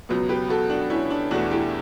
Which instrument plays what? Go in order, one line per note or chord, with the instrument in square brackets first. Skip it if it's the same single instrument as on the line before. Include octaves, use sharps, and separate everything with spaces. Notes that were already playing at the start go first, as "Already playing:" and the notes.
[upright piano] C#2 B2 F#3 B3
G4 B4
F#4 A4
D4 F#4
C#4 E4
D4
E2 B2 A3 D4 F#4
E4 G4